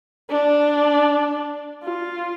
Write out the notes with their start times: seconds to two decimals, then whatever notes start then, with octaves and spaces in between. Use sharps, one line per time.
0.30 D4
1.83 F4